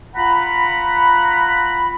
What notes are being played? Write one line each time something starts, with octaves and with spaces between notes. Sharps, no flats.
F4 F#5 A#5 B5